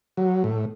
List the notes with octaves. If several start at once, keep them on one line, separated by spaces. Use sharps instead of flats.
F#3
A2